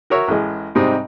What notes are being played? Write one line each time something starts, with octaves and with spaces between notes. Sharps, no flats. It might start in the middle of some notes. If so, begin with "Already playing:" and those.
F#4 A#4 C#5 E5
A1 G#3
G#2 C3 G3 C4 D#4